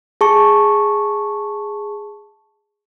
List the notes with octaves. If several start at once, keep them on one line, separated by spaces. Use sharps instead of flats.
G#4 A5 C#6